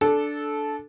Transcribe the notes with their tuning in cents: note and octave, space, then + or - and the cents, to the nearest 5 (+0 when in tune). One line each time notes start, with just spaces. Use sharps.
D4 +0 A4 -15